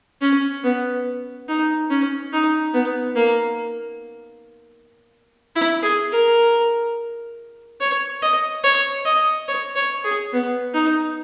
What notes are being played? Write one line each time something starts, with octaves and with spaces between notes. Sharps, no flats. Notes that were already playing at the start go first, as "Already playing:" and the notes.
C#4
B3
D#4
C#4
D#4
B3
A#3
E4
G#4
A#4
C#5
D#5
C#5
D#5
C#5
C#5
G#4
B3
D#4